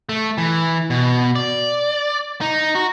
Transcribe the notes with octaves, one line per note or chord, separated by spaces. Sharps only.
A3
E3
B2
D5
D#4
F#4